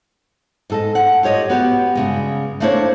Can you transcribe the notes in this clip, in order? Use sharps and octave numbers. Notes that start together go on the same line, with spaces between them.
G#2 A4 D#5
F#5
F4 G4 C#5 D#5
B3 F#4 G4
G2 C#3 G#3
A3 A#3 D4 E4 C5 C#5